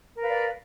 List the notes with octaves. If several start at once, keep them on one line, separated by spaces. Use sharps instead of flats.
A#4 B4 D5 F5